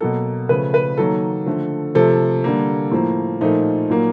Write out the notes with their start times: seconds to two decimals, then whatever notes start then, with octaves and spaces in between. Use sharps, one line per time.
0.01 B2 F#3 A#3 A4
0.49 C#3 F3 A3 B4
0.74 B4
0.97 D#3 F#3 A#3 A4
1.46 D3 F3 A3
1.95 C3 F3 A3 A4
2.44 D3 G3 A#3
2.91 A2 F3 A#3
3.41 A#2 F3 A3 D#4
3.90 A#2 F#3 A#3